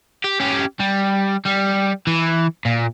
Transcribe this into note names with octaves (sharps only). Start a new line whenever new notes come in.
G4
C#4 G4
G3
G3
E3
A#2